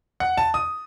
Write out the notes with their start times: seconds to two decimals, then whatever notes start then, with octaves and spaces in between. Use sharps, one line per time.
0.20 F#5
0.37 A5
0.54 D#6